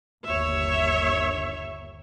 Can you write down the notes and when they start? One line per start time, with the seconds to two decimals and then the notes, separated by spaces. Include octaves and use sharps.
0.24 G1 D#2 C#5 E5